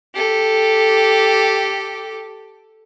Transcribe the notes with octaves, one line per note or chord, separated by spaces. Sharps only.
G4 A4